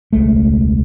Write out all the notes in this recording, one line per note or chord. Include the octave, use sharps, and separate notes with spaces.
E1 C#2 G#3 A3